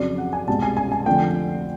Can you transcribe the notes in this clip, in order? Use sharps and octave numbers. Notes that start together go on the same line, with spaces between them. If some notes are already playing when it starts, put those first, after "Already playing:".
Already playing: F2 C#3 F#3 D5
F#5
G#5
C2 B2 G#3 A5
G#5
G#5
G#5
F2 D3 F3 A3 G5